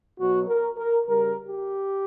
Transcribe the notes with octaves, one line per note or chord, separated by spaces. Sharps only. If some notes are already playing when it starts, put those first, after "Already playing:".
B2 F#3 F#4
A#4
A#4
C#3 G3 A#4
G4